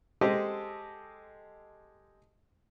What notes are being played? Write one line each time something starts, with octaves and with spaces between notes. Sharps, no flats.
G#3 G4 A4 C5 D#5